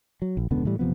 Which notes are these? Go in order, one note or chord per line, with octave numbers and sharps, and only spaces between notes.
F#3
A#1
E1 C#2 D3 B3
A2 E3 G3
F#1 C3 F3 B3